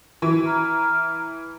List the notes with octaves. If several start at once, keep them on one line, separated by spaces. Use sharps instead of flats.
E3 F#4
A#5 F6